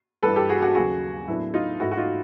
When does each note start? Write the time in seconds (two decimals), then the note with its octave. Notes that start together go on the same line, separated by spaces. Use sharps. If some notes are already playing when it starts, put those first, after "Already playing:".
0.23 G2 E3 G3 A4 B4
0.36 G4 A4
0.49 F#4 G#4
0.62 F#4 G#4
0.75 D#2 C#3 F#3 F#4 G#4
1.27 A2 F#3 B3 D4 E4
1.54 D#4 F4
1.80 G#2 E3 A3 E4 F#4
1.91 F#4
1.97 D#4 F4